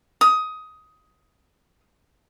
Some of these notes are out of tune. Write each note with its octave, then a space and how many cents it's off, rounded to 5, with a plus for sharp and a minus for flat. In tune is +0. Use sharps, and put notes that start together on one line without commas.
D#6 +15